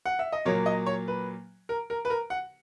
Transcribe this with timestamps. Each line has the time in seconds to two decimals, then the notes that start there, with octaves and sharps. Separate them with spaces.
0.06 F#5
0.19 E5
0.32 D#5
0.45 A#2 F#3 A#3 C#5
0.66 D#5
0.86 C#5
1.08 B4
1.69 A#4
1.90 A#4
2.05 B4
2.10 A#4
2.30 F#5